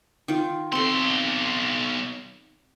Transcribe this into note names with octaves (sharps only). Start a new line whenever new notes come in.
D#3 F4
B1 C4 A4 C6